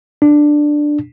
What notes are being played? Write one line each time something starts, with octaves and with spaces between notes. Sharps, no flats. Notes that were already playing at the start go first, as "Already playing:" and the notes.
D4